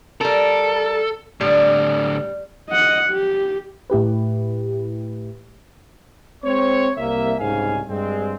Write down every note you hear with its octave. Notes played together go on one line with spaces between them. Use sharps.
G3 A4 A#4
A2 D3 G3
D#5 F#5
G4
A2 E4 G4 B4
G#3 C4 C5 C#5
C2 A#3 E5
C2 G#2 C#3 C#4 F5 G#5
G2 G#3 C4